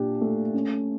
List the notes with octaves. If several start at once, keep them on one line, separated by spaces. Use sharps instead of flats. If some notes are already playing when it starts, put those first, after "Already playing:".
Already playing: A#2 D4 G4
A3
C#4